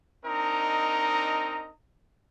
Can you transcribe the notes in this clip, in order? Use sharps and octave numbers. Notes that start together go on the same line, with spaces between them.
C4 D4 D#4 A#4 D#5 A#5